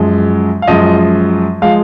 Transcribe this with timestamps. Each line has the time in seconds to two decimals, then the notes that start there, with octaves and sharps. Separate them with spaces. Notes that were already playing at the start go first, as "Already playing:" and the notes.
Already playing: F#2 F3 G#3
0.62 F5
0.67 F#2 F3 G#3 D#5
1.62 F3 G#3 F5